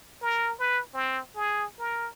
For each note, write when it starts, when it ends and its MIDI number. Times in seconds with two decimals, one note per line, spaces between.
0.21 0.53 70
0.59 0.80 71
0.94 1.20 60
1.35 1.65 68
1.79 2.08 70